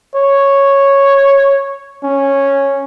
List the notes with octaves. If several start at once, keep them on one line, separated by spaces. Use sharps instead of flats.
C#5
C#4